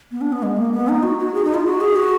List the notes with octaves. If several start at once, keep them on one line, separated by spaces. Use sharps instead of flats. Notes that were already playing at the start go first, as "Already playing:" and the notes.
B3
D4
B3
G#3
A#3
B3
D#4
F#4
F#4
G#4
D#4
F4
F#4
G#4
F#4